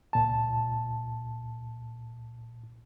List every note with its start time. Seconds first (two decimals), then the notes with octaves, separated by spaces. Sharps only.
0.13 C#2 A#2 A5